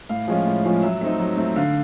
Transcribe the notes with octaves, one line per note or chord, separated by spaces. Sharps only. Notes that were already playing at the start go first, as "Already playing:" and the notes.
A2 F5
F3 G#3 C#4 F4
A2
F3 G#3 C#4 F4
F#3 E5
A3 C4 D#4 E5
F#3
A3 C4 D#4
D3 F5